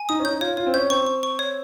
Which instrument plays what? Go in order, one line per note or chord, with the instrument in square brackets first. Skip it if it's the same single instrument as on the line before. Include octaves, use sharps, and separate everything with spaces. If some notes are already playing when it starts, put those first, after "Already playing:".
Already playing: [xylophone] G#5
[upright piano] D#4 [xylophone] D#6
[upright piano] C#4
[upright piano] D#4 [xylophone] G6
[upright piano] F4 [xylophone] C#5
[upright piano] F4 [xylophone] C#5
[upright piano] C4
[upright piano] C#4 [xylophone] G6
[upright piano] C4 [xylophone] C#6
[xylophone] C#6
C#6
C#5